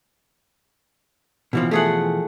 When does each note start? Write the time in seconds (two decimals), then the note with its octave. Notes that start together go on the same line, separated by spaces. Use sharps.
1.53 B2 E3 F3
1.71 A3 G#4 F#5